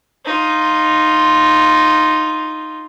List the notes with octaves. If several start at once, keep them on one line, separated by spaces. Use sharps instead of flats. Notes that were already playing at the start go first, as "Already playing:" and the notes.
D#4 F4